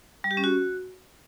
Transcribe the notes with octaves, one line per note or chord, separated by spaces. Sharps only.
G3
G4
C#4
F#4